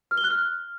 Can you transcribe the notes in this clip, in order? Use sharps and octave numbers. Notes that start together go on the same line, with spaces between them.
F6
G7
F#6
F6